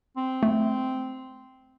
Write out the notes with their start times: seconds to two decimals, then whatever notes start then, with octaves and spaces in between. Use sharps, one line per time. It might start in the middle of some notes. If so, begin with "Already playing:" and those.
0.17 C4
0.43 A3